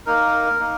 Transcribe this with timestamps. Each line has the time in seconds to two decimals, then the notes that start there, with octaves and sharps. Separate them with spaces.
0.06 A#3 D#4 A#4
0.60 A#3 D#4